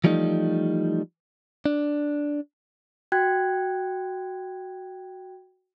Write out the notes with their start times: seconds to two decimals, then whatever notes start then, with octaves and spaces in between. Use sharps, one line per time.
0.04 E3 F3 G3 A3 D#4
1.66 D4
3.12 F#4 G5 F#6 G#6